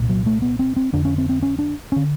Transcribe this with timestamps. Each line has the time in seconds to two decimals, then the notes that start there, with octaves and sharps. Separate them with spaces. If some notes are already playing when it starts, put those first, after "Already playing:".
Already playing: C2 A#2
0.09 F#3
0.26 A3
0.42 B3
0.59 C4
0.76 C4
0.93 F2 D3 D4
1.05 C#4
1.18 C4
1.29 C4
1.42 C#4
1.59 D4
1.92 D3 C#4